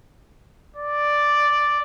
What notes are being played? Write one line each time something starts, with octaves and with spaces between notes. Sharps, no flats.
D5